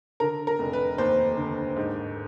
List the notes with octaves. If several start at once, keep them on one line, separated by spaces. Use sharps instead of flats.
D3 A#4
A#4
F1
B4
D#2 C5
D3
G#2